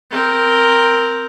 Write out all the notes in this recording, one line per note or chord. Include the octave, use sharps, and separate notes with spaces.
C4 A#4